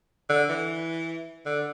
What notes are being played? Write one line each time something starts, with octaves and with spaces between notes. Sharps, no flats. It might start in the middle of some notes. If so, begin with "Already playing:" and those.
D3
E3
D3